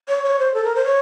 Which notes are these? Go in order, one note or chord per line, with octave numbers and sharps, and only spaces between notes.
C#5
C#5
C5
A4
A#4
C5
C#5